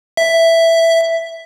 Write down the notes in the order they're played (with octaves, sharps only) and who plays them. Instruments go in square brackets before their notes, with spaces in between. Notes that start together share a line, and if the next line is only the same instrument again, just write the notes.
[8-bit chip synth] E5